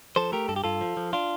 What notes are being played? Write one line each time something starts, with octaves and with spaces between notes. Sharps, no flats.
F3 A4 C5
A3 G4 A#4
G2 A4
G4
G2 F4 A4
F3
F3
D4 F4